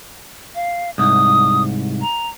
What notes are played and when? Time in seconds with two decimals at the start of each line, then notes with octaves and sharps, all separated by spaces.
0.55 F5
0.98 C2 G#2 D#6
2.01 A#5